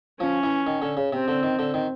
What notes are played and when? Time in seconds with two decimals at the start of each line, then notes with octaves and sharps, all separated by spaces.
0.20 F3 C#4
0.43 E3
0.67 D#3
0.82 D3
0.97 C#3
1.13 C3 C4
1.28 D3
1.43 D#3
1.59 D3
1.74 D#3